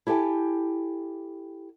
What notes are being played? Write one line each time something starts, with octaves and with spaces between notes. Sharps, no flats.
E4 G4 A4 G5 G#5